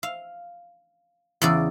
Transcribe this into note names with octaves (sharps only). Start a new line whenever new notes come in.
F5
E2 C#3 D5